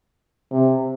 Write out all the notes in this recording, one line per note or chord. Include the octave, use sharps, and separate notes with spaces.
C3